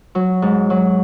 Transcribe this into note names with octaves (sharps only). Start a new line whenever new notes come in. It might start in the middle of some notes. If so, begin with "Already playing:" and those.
F#3
G#2
F#3